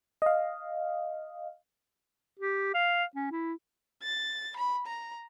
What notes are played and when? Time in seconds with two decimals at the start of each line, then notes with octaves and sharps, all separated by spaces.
0.22 D#5 F5
2.40 G4
2.74 F5
3.15 C#4
3.31 E4
4.03 A6
4.57 B5
4.87 A#5